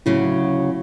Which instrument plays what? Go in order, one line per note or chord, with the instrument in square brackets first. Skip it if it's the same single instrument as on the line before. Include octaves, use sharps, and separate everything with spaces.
[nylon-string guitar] D2 C#3 F#3 [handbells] E4